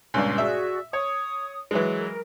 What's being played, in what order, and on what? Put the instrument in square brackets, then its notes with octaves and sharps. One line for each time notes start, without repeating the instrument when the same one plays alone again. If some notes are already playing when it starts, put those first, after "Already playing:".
[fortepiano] C#2 G2 A#2
[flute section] F#4 G#4 D5 [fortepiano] E5
[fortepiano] C#5 [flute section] D#6
[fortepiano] E3 F#3 G#3
[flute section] A#4